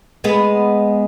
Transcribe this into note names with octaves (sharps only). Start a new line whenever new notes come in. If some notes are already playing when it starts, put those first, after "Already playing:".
G#3 B3